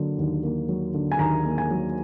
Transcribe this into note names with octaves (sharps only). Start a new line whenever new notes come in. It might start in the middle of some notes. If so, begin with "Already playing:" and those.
Already playing: D3 F#3 A#3
D#2
A#3
F#3
D3
G#5
D#2 A#5
A#3
G#5
F#3